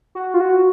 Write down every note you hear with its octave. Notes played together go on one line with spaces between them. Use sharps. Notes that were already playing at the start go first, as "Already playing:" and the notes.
F#4
F4
F#4